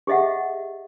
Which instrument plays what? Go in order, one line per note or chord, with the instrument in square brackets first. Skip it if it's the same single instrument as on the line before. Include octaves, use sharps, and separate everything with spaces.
[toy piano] G4 G#4 D#5 E5 F#5